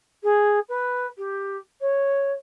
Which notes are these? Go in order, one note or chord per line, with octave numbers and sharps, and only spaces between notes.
G#4
B4
G4
C#5